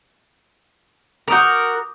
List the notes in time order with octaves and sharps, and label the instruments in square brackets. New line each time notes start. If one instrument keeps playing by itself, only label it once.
[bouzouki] F#4 A#4 [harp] D6 D#6 G6